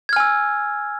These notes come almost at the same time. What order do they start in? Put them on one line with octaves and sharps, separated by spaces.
G#6 F6 G#5 E6